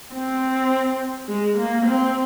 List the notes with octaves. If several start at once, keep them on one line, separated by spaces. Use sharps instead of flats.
C4
G#3
A#3
C4